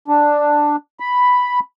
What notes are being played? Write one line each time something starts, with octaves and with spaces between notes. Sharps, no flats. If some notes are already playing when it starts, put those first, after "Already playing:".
D4
B5